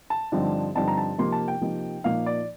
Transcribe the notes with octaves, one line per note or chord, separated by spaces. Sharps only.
A5
G2 D3 F3 C4 D#4
G2 D3 F3 C4 D#4 A5
A#5
A5
C3 F3 A#3 D#4 C6
A5
G5
C3 F3 A#3 D#4
A#2 F3 A#3 D#4 F5
D5